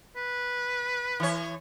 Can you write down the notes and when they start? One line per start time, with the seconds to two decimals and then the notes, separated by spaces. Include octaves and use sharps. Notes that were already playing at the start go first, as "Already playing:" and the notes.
0.16 B4
1.20 E3 C#5